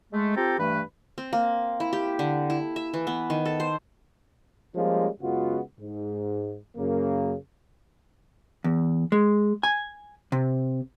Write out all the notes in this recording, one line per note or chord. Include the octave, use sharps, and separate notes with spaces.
G#3 A3
C4 F4 G4 A4 G5 A#5
G2 E3 A3 B4
C4
A#3
E4
G4
D3
E4
E5
E3
B3
D#3
A4
C5
F3 G3 G#3 A#3 C#4 F4
F#2 C#3 G#3 B3 F4 F#4
G#2
F#2 C#3 A#3
E2
G#3
G#5
C3